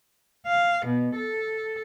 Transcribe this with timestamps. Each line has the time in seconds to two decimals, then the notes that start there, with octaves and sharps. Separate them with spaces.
0.46 F5
0.85 B2
1.15 A4